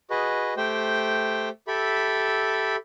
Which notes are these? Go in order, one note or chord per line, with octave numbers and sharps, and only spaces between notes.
F#4 G#4 B4 D#5
A3 G4 C5 G5
G4 A4 E5 B5